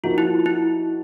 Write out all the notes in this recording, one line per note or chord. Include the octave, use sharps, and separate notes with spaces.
F3 A#3 D#4 F4 F#4
E4
E4